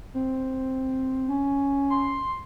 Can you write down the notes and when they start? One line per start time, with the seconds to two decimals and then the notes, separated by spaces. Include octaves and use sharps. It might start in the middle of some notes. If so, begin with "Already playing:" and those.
0.14 C4
1.27 C#4
1.90 C6